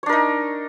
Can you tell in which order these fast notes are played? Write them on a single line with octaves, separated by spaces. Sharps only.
C#5 D4 A#4 D#4